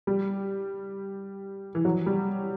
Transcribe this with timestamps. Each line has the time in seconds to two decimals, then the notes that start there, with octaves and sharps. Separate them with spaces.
0.07 G3
1.75 E3
1.85 F#3
2.06 G3